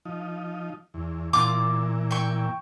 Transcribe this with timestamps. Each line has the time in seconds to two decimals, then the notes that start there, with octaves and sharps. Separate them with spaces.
0.05 F3 D#4
0.94 E2
1.33 A#2 E3 F4 D6
2.11 G5 C#6